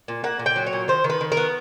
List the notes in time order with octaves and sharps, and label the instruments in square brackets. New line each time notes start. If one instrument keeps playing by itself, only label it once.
[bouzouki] A#2
A#3 F#5
A#2
G5
F#3
C#5
A#2
D#3 C5
D#3
B4
D#3
A#4
B3